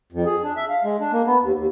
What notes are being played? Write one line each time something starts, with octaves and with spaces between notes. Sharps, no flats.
F2
G#4
D4
E5
F5
G#3
D4
A#3
B3
D#2
D#2